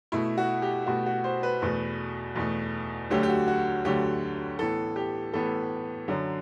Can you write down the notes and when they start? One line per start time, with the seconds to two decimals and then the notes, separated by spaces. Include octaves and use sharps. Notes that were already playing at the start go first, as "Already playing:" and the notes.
0.12 B2 A3 E4
0.38 F#4
0.62 G4
0.86 B2 A3 F#4
1.06 F#4
1.24 C5
1.43 B4
1.62 E2 B2 A3
2.35 E2 B2 A3
3.10 D2 D3 F#3 A3 G4
3.23 G4
3.30 F#4
3.48 F#4
3.85 D2 D3 F#3 A3 G4
4.59 A2 E3 B3 A4
4.96 G4
5.33 A2 E3 B3 A4
6.08 F#2 D3 F#3